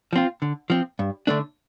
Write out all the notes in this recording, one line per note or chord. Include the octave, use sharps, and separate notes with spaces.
F3 C4 F4
D3
F3 C4
G2
D3 A3 D4